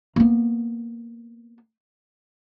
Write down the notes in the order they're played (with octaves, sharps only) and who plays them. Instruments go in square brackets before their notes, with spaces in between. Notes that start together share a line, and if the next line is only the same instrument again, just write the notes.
[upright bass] A#3 B3